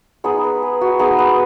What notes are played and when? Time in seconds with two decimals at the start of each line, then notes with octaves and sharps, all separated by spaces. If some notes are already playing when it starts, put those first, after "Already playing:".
0.24 G#3 B3 D#4 G#4
0.44 B4
0.63 G#4
0.81 F#4
0.99 G#3 B3 D#4 G#4
1.19 B4